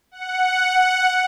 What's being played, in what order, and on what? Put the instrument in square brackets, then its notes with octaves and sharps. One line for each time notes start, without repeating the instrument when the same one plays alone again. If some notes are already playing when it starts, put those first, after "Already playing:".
[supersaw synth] F#5